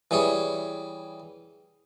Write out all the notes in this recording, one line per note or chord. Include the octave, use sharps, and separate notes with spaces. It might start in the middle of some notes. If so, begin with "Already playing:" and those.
E3 G3 G#4 C#5